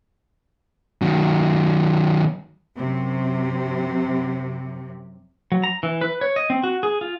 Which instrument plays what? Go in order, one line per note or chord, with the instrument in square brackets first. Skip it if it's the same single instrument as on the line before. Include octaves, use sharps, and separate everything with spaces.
[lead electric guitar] D#3 F#3
[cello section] F#2 C3
[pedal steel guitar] F#3
A#5
E3
B4
C#5
D#5
C4
F#4
G#4
F4